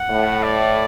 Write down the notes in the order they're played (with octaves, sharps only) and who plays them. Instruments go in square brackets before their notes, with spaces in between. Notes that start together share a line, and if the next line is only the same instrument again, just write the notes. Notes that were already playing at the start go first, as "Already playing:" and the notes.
Already playing: [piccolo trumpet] F#5
[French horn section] A2
[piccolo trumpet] D5